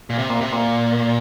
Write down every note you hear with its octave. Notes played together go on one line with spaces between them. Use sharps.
A#2
C3
A#2
C3
A#2